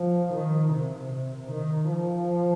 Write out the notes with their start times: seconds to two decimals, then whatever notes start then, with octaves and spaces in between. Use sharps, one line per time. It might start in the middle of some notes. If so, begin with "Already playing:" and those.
Already playing: F3
0.33 D#3
0.73 C3
1.12 C3
1.51 D#3
1.91 F3